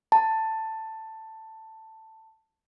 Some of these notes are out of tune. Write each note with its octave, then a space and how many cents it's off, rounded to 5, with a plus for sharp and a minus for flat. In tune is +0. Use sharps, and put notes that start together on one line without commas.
A5 +10